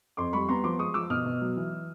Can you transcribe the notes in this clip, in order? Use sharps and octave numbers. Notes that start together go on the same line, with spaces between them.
F2 C6 D6
G3 B5 C#6
B3 A#5 C6
F3 C6 D6
G#3 C#6 D#6
F3 D6 E6
B2 D#6 F6
B2
F#3
E3